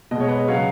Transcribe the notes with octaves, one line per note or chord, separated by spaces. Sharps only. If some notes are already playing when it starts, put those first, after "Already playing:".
B2 G#3 D#5
C#5
B4 D#5
C#3 F#3 C#5 F5